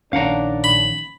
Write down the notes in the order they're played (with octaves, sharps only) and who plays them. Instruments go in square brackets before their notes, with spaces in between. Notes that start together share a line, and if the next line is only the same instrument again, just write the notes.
[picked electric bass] A#1 D#3 C#4 [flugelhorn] D4 [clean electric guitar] F5 F#5 A#5
[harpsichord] B5